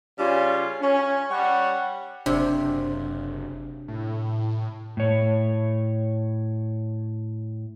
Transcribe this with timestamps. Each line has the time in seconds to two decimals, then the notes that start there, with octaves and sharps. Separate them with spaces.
0.19 C#3 G3 C#4 F4
0.80 C#4
1.31 G3 C#5 F#5
2.26 F#1 C3 D4
3.88 A2
4.97 A2 C#5